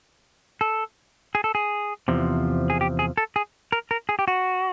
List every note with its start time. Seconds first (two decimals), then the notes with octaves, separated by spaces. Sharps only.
0.61 A4
1.35 G#4
1.44 A4
1.55 G#4
2.08 E2 C3 F3
2.70 G#4
2.81 G4
2.99 G#4
3.17 A4
3.36 G#4
3.72 A#4
3.91 A#4
4.09 G#4
4.19 G4
4.28 F#4